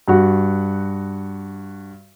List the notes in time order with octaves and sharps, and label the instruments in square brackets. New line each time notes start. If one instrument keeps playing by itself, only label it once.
[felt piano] G2 F#4